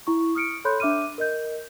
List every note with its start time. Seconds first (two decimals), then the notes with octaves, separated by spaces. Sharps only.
0.07 E4 C#6
0.35 D#6 F6 C#7 D7
0.65 A4 C#5 B5 C6 F#6 G6
0.80 D4 E5 D6 F6 D#7
1.18 A#4 D#5 G6